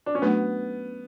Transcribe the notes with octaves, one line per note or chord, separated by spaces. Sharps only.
D4
C#4
F#3 A3 B3 D4 F#4